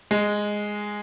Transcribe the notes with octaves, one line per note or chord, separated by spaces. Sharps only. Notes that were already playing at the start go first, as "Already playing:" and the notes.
G#3